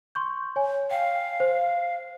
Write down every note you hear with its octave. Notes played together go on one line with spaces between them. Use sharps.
C6 C#6 G6
C#5 G#5
F5 G5
C5